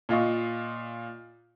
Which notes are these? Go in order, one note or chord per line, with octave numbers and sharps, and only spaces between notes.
A#2 F4 D#5 C#6